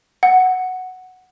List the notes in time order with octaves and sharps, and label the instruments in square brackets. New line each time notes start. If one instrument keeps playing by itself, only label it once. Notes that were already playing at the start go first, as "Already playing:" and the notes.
[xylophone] F#5